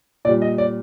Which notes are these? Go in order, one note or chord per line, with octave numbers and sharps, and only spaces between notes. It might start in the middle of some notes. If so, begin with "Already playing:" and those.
A#2 G3 D5
D#5
D5